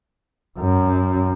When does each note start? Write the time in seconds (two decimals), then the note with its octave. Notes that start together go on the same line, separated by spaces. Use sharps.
0.59 F#2